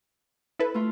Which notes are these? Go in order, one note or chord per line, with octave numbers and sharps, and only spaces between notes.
E4 A4 B4
A3 F4